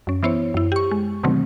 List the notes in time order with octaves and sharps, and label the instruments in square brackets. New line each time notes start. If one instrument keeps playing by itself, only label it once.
[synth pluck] F#2 C#4
E3 B3 E4 C5 C#5
F#2 E4
G4 C#6
G#3
B2 D3 D#3 F#3 A3 C4